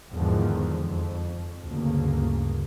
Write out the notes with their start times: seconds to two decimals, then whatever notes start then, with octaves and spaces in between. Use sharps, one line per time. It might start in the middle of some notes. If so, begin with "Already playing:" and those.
0.11 E2 G#2 D3 D#3 F3
0.77 F2
1.63 D2 G2 C#3 A#3